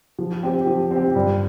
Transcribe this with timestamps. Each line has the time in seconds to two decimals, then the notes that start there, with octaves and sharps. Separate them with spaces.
0.19 F3
0.43 C4 G4
0.67 F3
0.91 C4 G4
1.15 G2